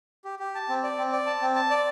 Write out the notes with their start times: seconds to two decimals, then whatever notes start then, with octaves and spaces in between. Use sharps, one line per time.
0.25 G4
0.39 G4
0.55 A5
0.69 C4
0.83 D5
0.98 C4
1.13 D5
1.26 A5
1.41 C4
1.55 A5
1.70 D5